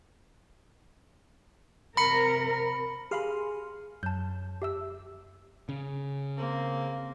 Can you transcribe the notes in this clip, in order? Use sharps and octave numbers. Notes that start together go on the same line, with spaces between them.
C3 A#4 B5 C#7
G4 G#4 F5 B5 C6 F6
F#2 A5 G6
G4 E5 E6
C#3
A#3 C4